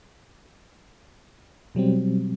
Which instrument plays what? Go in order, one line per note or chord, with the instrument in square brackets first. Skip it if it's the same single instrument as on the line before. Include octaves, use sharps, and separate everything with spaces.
[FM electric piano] B2 F#3 G3 C4